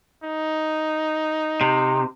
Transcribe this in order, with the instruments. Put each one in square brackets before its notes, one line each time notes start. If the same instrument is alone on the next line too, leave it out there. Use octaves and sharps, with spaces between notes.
[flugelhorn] D#4
[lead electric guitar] C3